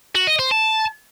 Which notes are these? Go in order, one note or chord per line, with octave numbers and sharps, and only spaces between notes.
F#4
D#5
C5
A5